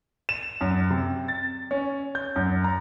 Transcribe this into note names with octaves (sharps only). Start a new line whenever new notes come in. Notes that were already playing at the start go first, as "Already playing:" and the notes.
E7
F#2
C3
A6
C#4
G6
F#2
A#5